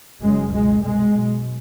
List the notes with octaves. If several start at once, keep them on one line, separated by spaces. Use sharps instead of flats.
F#1 F#2 C#3 G#3
C#2 B2 G#3
C2 B2 G#3
B1 B2